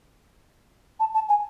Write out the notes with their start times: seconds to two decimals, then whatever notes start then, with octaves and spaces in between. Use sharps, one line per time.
1.00 A5
1.14 A5
1.29 G#5